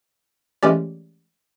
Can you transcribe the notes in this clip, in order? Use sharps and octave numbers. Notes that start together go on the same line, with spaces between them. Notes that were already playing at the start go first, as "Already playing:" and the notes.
E3 G#3 A3 C#4 G4 D5